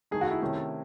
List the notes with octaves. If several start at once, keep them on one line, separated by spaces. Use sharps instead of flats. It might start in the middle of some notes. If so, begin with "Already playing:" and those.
D#3 A3 D#4 G#4
F#4
E4
C3 D#3 A3 C#4 E4